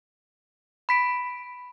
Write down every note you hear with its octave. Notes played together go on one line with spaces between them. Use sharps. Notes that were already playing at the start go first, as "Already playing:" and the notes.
B5 B6 D7